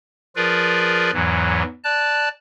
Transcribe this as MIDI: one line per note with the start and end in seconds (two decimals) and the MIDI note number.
0.36 1.11 53
0.36 1.11 65
0.36 1.11 68
0.36 1.11 70
0.36 1.11 71
0.36 1.11 74
1.13 1.63 40
1.13 1.63 44
1.13 1.63 52
1.13 1.63 54
1.84 2.28 74
1.84 2.28 81
1.84 2.28 90